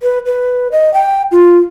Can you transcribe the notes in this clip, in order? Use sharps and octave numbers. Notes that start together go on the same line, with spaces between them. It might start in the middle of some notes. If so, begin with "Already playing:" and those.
B4
B4
D#5
G5
F4